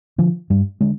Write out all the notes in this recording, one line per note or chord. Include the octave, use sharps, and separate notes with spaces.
D3 F3
G2 G3
D3 G#3